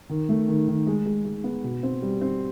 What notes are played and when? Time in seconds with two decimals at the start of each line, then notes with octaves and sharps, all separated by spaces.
0.09 D#3
0.29 A3
0.48 D#3
0.68 D#3
0.87 G#3
1.06 G#3
1.25 G#3
1.44 B3
1.64 B2
1.83 C4
2.02 G3
2.21 C4